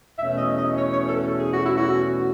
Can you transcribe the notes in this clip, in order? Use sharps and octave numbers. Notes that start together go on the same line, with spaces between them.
E2 B2 A3 C#4 E5
D#5
D#5
C#5
C#5
A4
G#4
F#4
E4
F#4